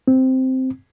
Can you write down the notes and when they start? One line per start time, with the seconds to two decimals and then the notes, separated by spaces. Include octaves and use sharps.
0.08 C4